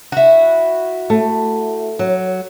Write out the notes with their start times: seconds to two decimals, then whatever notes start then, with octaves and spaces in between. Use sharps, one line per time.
0.12 E4 F#4
1.10 A3
1.99 F#3